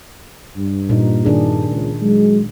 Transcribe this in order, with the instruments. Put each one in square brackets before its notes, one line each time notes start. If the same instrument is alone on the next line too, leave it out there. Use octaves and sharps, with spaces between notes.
[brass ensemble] G2
[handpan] A#2 D#4
D#3 D4 G#4
[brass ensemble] C#2
F#3 G#3